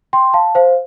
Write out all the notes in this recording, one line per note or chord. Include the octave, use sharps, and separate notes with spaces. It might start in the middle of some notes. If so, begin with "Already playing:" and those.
G5 C6
F5 A5
C5 F5